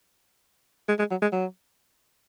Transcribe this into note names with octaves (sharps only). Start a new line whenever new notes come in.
G#3
G#3
F#3
G#3
F#3